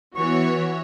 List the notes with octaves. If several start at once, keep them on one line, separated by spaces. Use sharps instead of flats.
E3 B3 F#4 C#5 E5 C#6